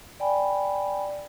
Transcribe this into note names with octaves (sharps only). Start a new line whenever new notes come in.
D5 G5 G#5 B5